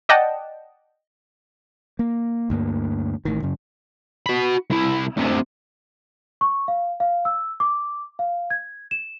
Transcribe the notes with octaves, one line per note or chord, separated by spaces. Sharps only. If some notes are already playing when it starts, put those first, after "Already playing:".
D5 D#5 F#5 G5 A5
A#3
D2 G2 A#3
A1 A2 D#3
F#2 C#3
F#4 B5
C2 E4
D2 C3
C#6
F5
F5
E6
D6
F5
G#6
E7